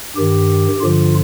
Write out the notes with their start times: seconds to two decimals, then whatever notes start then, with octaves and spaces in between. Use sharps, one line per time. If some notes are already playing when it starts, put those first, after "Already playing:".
0.16 G2 D#3 G4
0.80 G2 D3 F3 F4